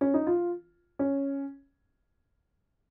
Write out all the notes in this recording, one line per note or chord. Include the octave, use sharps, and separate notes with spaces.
C#4
D#4
F4
C#4